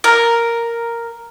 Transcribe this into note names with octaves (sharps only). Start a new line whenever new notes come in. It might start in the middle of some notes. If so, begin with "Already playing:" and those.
A#4